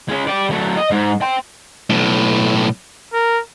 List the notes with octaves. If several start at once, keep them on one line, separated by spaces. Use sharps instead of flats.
G#3 C#4
G4 D5
F#3 A3
D#5
G#2
G5 C6
B1 A2
A#4